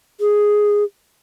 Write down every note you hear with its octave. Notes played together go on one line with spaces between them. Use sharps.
G#4